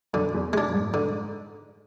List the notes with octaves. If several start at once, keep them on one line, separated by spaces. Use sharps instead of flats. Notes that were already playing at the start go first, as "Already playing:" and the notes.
F#2 D3
E2
G#3 D4
F#2
G#2
D3